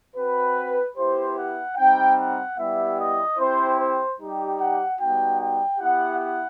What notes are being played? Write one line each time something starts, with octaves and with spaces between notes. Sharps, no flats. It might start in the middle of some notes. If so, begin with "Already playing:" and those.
C4 F#4 B4
B3 E4 G4 C5
F#5
G3 C4 D#4 G5
F#5
G3 B3 E4 G4 E5
D#5
C4 E4 G4 C5
C5
G3 D#4 G4
F#5
G3 B3 D#4 F#4 G5
G5
B3 E4 G4 F#5
F#5